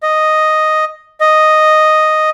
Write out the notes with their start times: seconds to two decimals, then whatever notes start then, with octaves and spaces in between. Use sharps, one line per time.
0.03 D#5
1.21 D#5